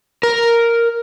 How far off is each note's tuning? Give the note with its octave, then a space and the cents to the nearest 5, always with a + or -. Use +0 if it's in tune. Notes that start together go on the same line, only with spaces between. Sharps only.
A#4 +0